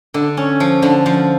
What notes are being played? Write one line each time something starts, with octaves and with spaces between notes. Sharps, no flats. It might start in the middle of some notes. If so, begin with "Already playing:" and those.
D3
C#4
F3
D3
F3